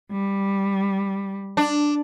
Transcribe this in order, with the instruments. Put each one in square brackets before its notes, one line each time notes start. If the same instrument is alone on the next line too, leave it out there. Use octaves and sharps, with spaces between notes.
[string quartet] G3
[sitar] D4